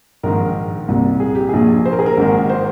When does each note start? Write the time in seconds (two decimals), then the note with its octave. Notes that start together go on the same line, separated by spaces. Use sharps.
0.23 A#1 G#2 D#3 A#4
0.88 C2 A#2
1.20 G#4
1.35 G4
1.49 A#1 A#2 G#4
1.86 C5
1.92 A#4
1.99 G#4
2.06 A#4
2.17 G#1 G#2 D#3
2.50 C5